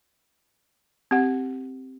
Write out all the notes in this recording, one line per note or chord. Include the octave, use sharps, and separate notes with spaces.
C4 G4 F#5